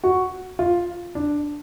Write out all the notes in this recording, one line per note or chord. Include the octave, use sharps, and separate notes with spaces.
F#4
F4
D4